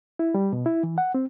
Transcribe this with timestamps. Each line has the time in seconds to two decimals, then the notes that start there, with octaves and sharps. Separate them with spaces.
0.19 E4
0.34 G3
0.53 B2
0.66 E4
0.83 E3
0.98 F#5
1.15 C4